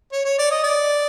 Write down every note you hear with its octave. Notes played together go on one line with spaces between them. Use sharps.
C#5
C#5
D5
D#5
D5